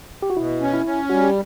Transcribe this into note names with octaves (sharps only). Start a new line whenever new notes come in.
G4
F#4
B2 E4
C#4
E4
C#4
G3 F#4
G4